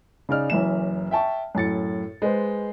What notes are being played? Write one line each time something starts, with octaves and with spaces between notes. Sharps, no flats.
C#3 D#4 D5 F6
F#1 F#2 E3 E5 E7
E5 G5 A5 C#6
F#2 A2 A6 C#7
G#3 B4 C5